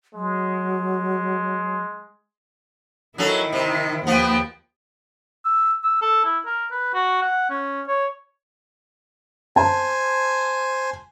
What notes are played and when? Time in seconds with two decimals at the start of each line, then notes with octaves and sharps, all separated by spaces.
0.15 F#3 G#3
3.18 D#3 F#3 C#4 E4 A4
3.53 C3
4.07 D#2 F3 B3 G5
5.45 E6
5.84 E6
6.02 A4
6.25 E4
6.46 A#4
6.71 B4
6.94 F#4
7.22 F#5
7.50 C#4
7.88 C#5
9.56 C5 G#5 A5